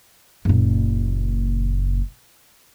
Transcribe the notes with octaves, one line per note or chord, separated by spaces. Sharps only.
F#1 A#2